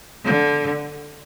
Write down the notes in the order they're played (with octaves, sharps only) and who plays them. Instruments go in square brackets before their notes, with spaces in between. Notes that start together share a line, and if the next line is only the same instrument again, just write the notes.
[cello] D3